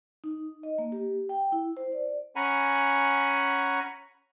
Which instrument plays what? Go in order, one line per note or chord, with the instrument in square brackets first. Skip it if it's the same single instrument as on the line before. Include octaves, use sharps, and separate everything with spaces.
[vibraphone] D#4
D#5
A#3
G4
G5
E4
C5
D5
[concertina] C#4 F#5 G#5 A#5 B5